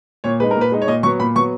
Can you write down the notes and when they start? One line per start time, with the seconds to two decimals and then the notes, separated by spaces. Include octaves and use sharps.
0.24 A#2 C#5
0.40 G#3 D#4 B4
0.51 A#4
0.56 A#2
0.61 B4
0.72 G#3 D#4
0.82 C#5
0.87 A#2 D#5
1.03 F#3 B3 C#6
1.20 A#2 B5
1.35 F#3 B3 C#6